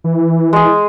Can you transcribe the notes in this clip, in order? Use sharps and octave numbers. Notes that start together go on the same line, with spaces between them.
E3
G#3 G#4